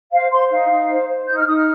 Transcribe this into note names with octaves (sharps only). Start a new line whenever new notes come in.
C5 F5
C5 C6
D#4 F5
D#4
C5
C5
D#4 G6
F6
D#4 D#6
F6